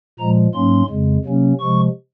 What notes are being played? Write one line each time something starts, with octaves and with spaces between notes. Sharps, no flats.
A#2 F3 G#3 A#5
G#2 F#3 A#3 C#4 C6
F2 C#3 G#3
C3 F#3 A#3 C#4
C3 F3 G#3 C#6